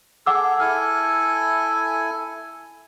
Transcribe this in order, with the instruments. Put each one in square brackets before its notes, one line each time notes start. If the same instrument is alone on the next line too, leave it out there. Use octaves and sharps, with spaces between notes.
[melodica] G#4 A4 [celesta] F#5 D6 E6
[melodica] E4 A4 G#5 [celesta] F6